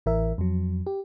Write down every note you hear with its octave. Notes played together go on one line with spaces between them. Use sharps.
A1 E3 A#4 E5
F2 F#3
G4